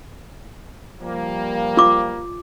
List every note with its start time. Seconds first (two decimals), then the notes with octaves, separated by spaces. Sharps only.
1.00 F3 G3 A#3
1.77 F4 D6